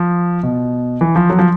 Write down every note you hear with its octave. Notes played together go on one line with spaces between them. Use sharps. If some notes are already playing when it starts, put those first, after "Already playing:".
Already playing: F3
B2
E3
F3
F#3
F3